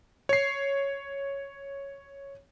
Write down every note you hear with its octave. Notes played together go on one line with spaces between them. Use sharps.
C#5 C7